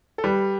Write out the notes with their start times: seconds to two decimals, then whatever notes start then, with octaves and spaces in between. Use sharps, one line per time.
0.18 A4
0.24 G3 G4 B4